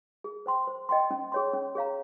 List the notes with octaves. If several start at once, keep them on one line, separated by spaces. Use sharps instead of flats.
G#4
C5 G5 C6
C5
D#5 G5 C6
C#4
G#4 C#5 G5 C6
C#4
G#4 C#5 F5 A#5